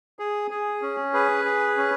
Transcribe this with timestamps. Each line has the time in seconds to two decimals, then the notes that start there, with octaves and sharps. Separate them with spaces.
0.19 G#4
0.51 G#4
0.82 C#4
1.14 G#4 B4
1.45 G#4
1.77 C#4